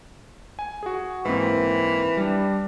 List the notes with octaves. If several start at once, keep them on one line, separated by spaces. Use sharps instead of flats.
G#5
F#4 G#4
G#2 E3 A#3 C4
G3 D4